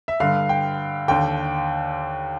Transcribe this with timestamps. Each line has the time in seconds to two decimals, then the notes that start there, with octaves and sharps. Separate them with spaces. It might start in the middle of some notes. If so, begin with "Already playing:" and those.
0.08 E5
0.20 G2 D3 F5
0.49 G5
1.08 D#2 D3 G5